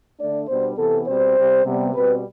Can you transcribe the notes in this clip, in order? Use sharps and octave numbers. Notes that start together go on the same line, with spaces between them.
D3 A3 D4 D5
B2 G3 B3 D4 C5
C3 E3 B3 A4
B2 G3 C4 C5
C3 G3 C4
C3 G3 B3
B2 G3 C4 B4